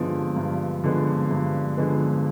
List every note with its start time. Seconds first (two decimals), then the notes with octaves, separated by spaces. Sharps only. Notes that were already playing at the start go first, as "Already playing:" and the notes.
Already playing: G2 D3 F3 G#3 B3
0.37 G2
0.84 D3 F3 G#3 B3
1.31 G2
1.77 D3 F3 G#3 B3